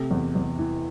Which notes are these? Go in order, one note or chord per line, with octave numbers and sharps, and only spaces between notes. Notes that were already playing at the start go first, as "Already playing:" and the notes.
Already playing: C3 A3
E2
E2
E3